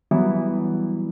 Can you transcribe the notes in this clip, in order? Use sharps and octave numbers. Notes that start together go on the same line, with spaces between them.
E3 F#3 G3 B3 E4